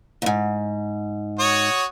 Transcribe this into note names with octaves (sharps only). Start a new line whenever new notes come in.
D#2 G#2
F#4 C#5 D#6